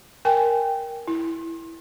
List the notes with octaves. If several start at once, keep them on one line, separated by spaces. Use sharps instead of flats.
A#4 G5 G#5
E4